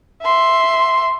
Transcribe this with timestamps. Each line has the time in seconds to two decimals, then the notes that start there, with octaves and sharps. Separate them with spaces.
0.22 E5 C6